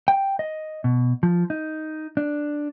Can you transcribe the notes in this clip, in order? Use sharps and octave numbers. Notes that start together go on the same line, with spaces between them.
G5
D#5
B2
F3
D#4
D4